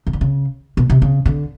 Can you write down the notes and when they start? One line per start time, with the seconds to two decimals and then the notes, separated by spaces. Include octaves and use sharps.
0.07 C#3
0.13 D3
0.21 C#3
0.77 B2
0.90 C3
1.02 C#3
1.26 D3